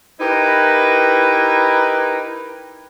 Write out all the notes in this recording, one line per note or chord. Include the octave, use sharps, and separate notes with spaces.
D#4 E4 G4 A#4 B4